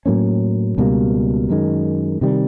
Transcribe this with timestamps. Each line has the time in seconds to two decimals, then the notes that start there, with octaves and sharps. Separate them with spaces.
0.06 A2 F#3 A#3 C#4
0.78 C#2 B2 G3 A#3
1.50 F#2 D#3 G#3
2.21 C3 D#3 G3